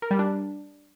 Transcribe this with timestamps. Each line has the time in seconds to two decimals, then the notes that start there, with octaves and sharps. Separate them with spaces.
0.02 A#4
0.11 G3
0.19 D4